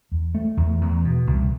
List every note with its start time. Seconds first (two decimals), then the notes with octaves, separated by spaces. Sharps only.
0.12 E2
0.35 A3
0.57 E2
0.81 E2
1.04 B2
1.27 C2